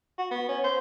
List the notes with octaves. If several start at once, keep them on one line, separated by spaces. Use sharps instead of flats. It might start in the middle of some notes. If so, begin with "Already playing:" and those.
F#4
B3
C#4
C5